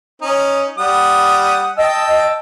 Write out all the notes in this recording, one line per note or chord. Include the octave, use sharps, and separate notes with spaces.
C#4 D#4
G3 F#5 D#6
D#5 G5 A5 E6